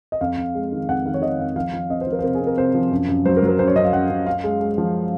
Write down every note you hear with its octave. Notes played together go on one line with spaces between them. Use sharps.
D#5
F2 F5
F2
G#3
D#3
F2 F#5
D#3 F5
C#5
D#3 D#5
F2 F5
F3 F5
F3
C4 D#5
C5
F3
A#4
C5
C3 A#4
G#4
C4
A#4
C3 C5
F3
F#2
F#2
F#3 C5
A#4
F#3
A#4
F#2 C5
C#5
F#2 D#5
F5
F#2 F#5
F#2
C#4 F5
G#3
G#3
F3